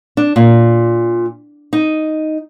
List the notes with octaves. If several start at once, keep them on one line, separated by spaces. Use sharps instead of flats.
D4
A#2
D#4